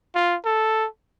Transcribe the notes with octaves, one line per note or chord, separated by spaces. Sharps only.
F4
A4